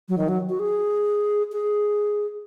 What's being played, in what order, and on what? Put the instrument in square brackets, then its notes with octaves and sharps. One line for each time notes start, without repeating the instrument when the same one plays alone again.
[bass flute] F#3
D#3
F#3
F#4
G#4
G#4